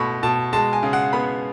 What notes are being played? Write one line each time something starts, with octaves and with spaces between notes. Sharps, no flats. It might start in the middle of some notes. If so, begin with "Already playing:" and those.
Already playing: B2 A3 B5 C#6
B2 A5
G#3 A5
G#5
C#3
F#5
B3 B5